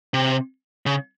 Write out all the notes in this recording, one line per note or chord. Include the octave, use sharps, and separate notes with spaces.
C3
C#3